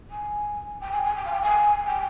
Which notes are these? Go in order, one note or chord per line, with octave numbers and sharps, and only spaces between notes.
G#5
G5
G#5
G#5
G5
F5
G5
G#5
G5